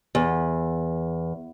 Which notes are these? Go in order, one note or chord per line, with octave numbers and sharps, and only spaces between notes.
E2